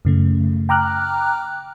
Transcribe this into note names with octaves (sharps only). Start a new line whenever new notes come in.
F#2 C#3 A3
G5 A#5 D6 F6 F#6